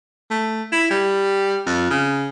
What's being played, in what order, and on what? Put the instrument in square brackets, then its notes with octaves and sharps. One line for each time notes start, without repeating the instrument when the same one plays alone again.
[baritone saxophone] A3
E4
G3
F2
C#3